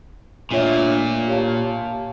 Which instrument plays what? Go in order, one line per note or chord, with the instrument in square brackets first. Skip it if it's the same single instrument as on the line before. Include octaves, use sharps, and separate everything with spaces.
[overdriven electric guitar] A#2 [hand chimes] A3 D4 F4 C#5 E5
[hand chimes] G4 C#5 F5 A5